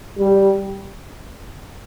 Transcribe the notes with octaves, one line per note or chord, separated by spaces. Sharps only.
G3